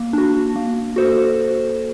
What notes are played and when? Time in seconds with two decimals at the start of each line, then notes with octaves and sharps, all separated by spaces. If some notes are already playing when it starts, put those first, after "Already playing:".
Already playing: A#3
0.13 D4 F#4
0.56 A#3
0.96 F#4 A4 C5